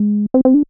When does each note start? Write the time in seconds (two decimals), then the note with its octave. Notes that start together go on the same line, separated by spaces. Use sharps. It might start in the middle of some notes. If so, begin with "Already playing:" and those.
Already playing: G#3
0.34 C4
0.45 C4
0.54 D4